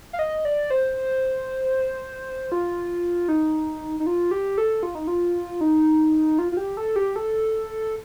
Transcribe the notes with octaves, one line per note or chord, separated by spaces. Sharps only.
F5
D#5
D5
C5
F4
D#4
D#4
F4
G4
A4
F4
D#4
F4
D#4
F4
F4
G4
A4
G4
A4